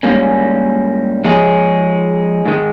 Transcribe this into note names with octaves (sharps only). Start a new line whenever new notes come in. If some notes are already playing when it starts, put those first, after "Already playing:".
G#2 G3 A#3 C#4
F3 G#3 D#4 G#4 C#5
G#2 D#3 G#3